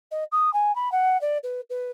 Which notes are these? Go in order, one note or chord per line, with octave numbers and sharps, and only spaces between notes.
D#5
D#6
G#5
B5
F#5
D5
B4
B4